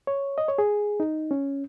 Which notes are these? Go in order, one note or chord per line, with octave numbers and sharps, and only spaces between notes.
C#5
D#5
C#5
G#4
D#4
C#4